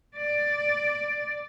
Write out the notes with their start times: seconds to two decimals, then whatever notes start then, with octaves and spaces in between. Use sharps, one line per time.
0.16 D5